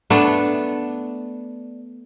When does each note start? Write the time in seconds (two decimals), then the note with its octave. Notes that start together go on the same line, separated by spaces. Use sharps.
0.10 A3 B3 D4